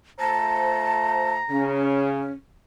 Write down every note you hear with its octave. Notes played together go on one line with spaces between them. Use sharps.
A3 F4 C5 A5 A#5
C#3 C#4